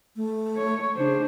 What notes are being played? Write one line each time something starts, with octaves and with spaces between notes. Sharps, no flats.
A3
C#5
C#3 D4 C5